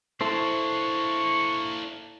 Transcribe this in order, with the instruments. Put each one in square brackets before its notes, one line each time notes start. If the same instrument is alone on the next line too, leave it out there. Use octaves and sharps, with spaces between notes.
[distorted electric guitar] A#3 D4 [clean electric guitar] E4 A4 C5 [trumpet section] C#6